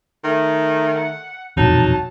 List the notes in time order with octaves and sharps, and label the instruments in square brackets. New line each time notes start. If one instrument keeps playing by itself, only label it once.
[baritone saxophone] D#3 [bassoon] A3
[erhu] F#5
[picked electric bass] E1 A#1 F2 [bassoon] F#3 [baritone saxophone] D#4 [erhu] A5